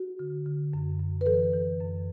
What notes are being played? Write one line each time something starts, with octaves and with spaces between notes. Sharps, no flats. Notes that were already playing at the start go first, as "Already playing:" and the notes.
Already playing: F#4
D3
D3
F#2
F#2
B4
E3 A4
E3
F#2